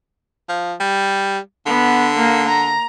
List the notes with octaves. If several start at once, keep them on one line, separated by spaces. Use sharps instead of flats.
F3
G3
D3 B3
A#3
A#5